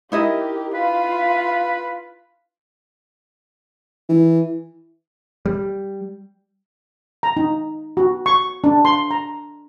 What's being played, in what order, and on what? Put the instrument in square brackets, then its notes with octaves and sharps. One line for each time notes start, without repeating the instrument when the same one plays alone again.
[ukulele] D#4 E4 D#5 [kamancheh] G4 A#4
[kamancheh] F4 F5 [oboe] B4
[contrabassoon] E3
[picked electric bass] G3
[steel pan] A#5
D#4
F#4
C#6
D4
C6
A#5